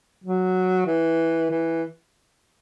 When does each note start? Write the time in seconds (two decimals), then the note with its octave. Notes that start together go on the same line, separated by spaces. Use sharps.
0.24 F#3
0.87 E3
1.50 E3